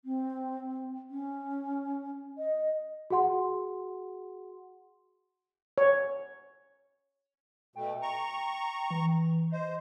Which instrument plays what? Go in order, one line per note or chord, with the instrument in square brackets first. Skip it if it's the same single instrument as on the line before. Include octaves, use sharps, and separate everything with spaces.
[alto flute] C4
C#4
D#5
[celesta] F#4 G#4 F#5 C6
[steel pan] C#5
[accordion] B2 A3 [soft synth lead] G5
[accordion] A#5 C#6
[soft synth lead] E3
[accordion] C5 [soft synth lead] D#5